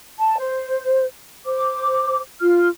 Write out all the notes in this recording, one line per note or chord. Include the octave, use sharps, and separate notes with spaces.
A5
C5
C5 D6
F4 F6